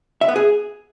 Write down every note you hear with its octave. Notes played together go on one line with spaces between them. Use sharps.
E5
B3
G#4